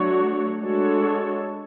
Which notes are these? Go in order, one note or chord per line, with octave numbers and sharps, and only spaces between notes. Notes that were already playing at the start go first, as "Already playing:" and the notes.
Already playing: F#3 A3 D4 F#4 C#5
G#3 D4 F#4 A4 C#5